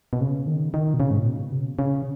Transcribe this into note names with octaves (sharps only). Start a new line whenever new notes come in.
B2
C#3
D#3
D#3
B2
C#3
G#2
A#2
B2
C#3
C#3